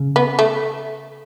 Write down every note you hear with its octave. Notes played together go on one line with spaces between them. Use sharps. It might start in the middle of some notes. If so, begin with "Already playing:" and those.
Already playing: C#3
B3
A3